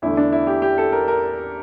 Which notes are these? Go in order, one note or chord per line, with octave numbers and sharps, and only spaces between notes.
E2 D3 A3 E4
D4
E4
G4
G4
A4
A#4
A#4